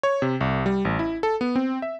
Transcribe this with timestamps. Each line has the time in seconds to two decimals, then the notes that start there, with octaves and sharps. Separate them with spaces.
0.03 C#5
0.22 C3
0.41 C2
0.66 G3
0.85 A1
0.99 E4
1.23 A4
1.41 B3
1.56 C4
1.82 E5